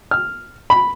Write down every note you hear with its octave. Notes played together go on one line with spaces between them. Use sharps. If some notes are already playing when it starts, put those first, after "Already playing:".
F6
B5